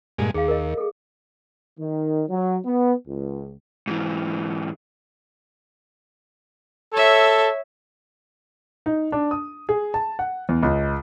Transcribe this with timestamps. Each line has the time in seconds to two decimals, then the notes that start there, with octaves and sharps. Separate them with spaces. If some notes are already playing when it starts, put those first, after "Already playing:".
0.19 G2 A#2 G#3
0.34 D#2 G#4 F5
0.48 A#4 D#5
0.78 G#4 A4
1.80 D#3
2.29 F#3
2.66 B3
3.08 C#2
3.87 G#2 E3
6.94 A4 C#5 E5
8.86 D#4
9.12 D4
9.31 D#6
9.69 G#4
9.94 A5
10.19 F#5
10.49 E2
10.63 C#2